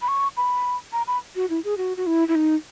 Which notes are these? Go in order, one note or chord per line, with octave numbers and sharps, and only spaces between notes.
B5
C#6
B5
A#5
B5
F#4
E4
G#4
F#4
F#4
E4
E4
D#4